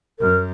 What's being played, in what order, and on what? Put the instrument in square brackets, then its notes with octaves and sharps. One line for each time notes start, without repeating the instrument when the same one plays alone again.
[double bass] F#2 [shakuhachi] A#4